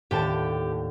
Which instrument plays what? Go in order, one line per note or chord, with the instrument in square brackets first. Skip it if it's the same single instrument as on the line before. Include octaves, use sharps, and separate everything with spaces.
[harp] D#1 A2 [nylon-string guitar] G4 G5 A5